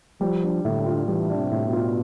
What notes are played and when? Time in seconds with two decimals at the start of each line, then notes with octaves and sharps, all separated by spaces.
0.21 F3 G3
0.43 D4
0.64 A2 D3
0.86 F4
1.07 E3 G3
1.29 D4
1.36 C3
1.51 A2
1.66 B2
1.73 F4